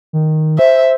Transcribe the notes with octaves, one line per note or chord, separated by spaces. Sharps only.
D#3
C5 E5